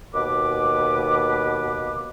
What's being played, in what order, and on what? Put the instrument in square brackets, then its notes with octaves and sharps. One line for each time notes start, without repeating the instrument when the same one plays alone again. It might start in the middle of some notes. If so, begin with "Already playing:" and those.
[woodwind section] D#2 B2 B4 D6